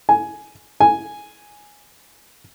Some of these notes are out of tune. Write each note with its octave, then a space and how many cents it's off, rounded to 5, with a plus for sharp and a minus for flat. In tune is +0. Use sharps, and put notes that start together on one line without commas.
G#5 +10
G#5 +0